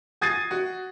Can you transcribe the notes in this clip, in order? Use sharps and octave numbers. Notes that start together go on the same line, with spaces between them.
G#5 D#6 G#6 A6 C7 D#7
F#4